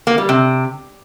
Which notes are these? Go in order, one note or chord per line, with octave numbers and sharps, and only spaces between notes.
A#3
G3
C3